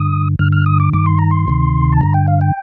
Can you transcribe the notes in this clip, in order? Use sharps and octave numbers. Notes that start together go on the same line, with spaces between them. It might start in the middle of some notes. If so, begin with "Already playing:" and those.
Already playing: G2 D3 D#6
G2 D3 F6
F6
D#6
D6
G2 D#3 D6
C6
A#5
C6
D2 C3 D#3
A5
G2 D3 A#5
G5
F5
G5